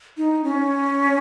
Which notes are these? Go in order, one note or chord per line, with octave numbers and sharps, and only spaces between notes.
D#4
C#4